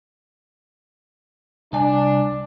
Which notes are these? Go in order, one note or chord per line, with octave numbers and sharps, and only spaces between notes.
C2 D4 G#5